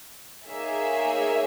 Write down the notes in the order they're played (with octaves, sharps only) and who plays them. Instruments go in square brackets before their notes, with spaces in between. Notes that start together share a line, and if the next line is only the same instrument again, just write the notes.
[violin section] A#3 D#4 G#4 C#5 E5